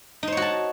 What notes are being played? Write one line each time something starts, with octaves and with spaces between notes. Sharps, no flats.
D#4 F#4 C5 C#5 A5